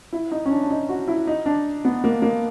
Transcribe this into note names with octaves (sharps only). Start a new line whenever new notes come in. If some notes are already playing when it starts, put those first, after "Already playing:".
E4
D#4
C#4
D4
D4
D#4
F#4
E4
D#4
D4
B3
A#3
A#3